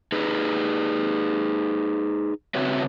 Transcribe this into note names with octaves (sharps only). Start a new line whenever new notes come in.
D#4 G#4 B4
C#3 C4 F#4 B4 C#5 E5